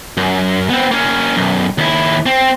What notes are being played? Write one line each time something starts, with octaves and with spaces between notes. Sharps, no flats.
F#2
B3 C4
A#3 C#4
B1 F#2
D#2 E4
C4